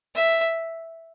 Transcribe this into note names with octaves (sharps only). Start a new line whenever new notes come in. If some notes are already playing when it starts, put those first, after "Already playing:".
E5